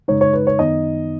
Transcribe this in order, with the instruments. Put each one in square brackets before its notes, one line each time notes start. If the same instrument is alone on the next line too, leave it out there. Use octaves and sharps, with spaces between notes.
[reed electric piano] F#2 C#3 G#3 D#4 [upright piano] C#5
[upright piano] C#5
B4
C#5
[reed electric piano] F#2 D#3 B3 D#4 [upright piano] D#5